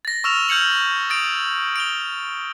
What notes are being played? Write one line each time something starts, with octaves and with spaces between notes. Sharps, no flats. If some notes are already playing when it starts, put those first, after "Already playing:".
A6 A#6
C#6 E6 F6 E7 F7
F6 G6 G#6 C#7 F#7
D#6 A6 D7 F7
D7 F7 G7